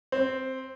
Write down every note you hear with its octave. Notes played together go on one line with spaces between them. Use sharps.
C4